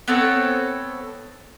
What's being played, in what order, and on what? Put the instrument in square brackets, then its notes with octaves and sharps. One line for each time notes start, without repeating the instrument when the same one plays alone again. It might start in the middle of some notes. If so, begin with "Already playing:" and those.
[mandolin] B3 C4 A4 C#5